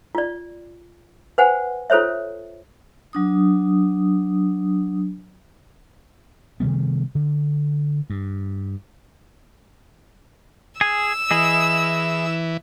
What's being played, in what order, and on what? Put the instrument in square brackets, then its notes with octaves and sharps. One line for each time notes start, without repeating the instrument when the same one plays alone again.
[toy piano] F4 D5
B4 C5 F#5 G#5
F4 A4 C5 C#5 E5
[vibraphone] F#3 D4 D#6
[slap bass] C3 D#3 G3 B3
D3
G2
[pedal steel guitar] G#4 G#5 [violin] E6
[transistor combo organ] E3 [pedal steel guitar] E4 G#4 D#5